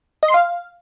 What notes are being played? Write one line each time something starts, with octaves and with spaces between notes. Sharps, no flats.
D#5
C6
F5